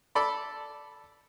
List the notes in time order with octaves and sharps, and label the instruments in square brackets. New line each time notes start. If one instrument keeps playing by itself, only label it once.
[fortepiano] A4 D5 B5